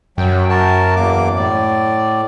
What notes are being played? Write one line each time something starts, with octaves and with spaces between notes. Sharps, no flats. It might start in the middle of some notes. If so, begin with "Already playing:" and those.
F#2 F#3 G5
F#4 A#4 A5
E2 A#3 D6
A2 D5